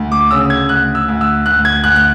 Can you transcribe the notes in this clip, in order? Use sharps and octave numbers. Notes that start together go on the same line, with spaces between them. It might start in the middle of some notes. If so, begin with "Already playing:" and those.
Already playing: D2
D6
C#3 E6
G#6
D2 F#6
E6
D2
E6
D2 F#6
G#6
D2 F#6
F#6